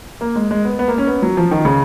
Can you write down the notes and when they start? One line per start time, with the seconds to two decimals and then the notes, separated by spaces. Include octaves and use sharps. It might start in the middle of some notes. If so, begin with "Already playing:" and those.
0.21 A#3
0.36 G#3
0.51 G#3
0.65 B3
0.79 B3
0.88 A#3
0.98 C#4
1.07 B3
1.22 F#3
1.37 F3
1.51 D#3
1.65 C#3